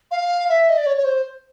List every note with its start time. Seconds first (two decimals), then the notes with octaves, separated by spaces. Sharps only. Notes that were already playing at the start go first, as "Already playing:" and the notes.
0.11 F5
0.49 E5
0.69 D#5
0.78 D5
0.86 C#5
0.98 C#5
1.04 C5